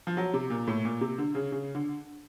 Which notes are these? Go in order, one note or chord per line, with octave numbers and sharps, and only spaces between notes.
F3
F#3
C3
A#2
A2
A#2
C3
D3
C#3
C#3
D3